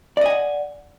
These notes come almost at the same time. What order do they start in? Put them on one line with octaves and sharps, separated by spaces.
D5 D#5 G#5 F#5